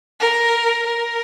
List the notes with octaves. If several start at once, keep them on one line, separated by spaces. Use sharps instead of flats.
A#4
A#4